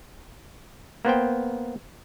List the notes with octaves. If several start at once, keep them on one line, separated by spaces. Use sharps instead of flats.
A#3 B3 C5 G5